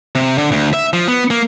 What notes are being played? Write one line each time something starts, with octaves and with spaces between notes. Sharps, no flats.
C3
D3
D2
E5
F3
B3
A#3